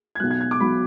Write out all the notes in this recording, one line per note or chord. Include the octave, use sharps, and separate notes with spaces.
G#6
B1 B2 F#3 F#6
G#6
G#6
D6
B1 B2 F#3 B5